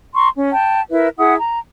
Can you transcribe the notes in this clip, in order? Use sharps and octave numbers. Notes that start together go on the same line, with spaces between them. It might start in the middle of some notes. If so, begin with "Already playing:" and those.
A#5 C6 C#6
C#4
G5 A5
E4 A#4 B4 E5
E4 G#4 F#5 D#6
A#5